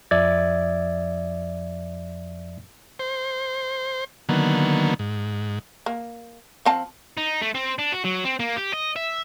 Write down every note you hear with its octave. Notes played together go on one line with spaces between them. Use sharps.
F2 F3 D5 E5 G#6 A6
C5
D3 D#3 F#3 A#3 B3
G#2
A#3
F3 C4 A5
D#4
A3
C4
D4
F#4
F#3
C4
A#3
G4
D#5
E5